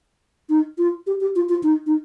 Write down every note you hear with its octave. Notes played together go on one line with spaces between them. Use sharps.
D#4
F4
G4
G4
F4
F4
D#4
D#4